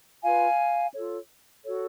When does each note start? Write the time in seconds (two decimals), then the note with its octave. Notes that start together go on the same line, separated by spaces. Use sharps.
0.23 F4 B4 F5 G#5
0.94 F4 A4 C#5
1.64 F#4 A4 C#5